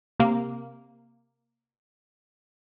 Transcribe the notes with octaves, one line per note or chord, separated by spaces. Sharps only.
C3 A#3